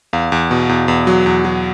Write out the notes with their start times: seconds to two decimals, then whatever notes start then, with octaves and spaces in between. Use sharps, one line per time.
0.13 E2 F5
0.32 E2
0.51 B2
0.69 E2
0.88 E2
1.07 F#3
1.26 E2
1.45 F#3